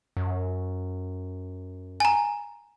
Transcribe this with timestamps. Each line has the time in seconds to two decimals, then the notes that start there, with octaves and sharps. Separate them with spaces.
0.17 F#2
2.00 G#5 A#5